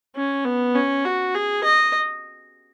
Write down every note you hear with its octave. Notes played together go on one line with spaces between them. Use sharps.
C#4
B3
C#4
F#4
G#4
D#5